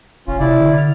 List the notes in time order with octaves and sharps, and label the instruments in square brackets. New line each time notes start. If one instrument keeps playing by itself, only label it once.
[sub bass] F1 [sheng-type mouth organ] C#4 F4
[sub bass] C3 [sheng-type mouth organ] E4 D5
[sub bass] D3
[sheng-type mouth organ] F6